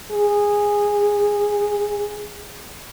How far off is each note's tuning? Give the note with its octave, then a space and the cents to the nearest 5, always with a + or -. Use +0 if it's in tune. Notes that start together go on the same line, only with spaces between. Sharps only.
G#4 -15